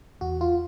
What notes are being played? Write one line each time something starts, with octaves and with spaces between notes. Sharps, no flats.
E2 F#4
F4